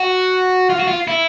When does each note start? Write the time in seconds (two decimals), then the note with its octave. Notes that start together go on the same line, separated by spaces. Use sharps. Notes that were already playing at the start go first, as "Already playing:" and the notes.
Already playing: F#4
0.70 F4
0.79 F#4
0.88 F4
1.08 E4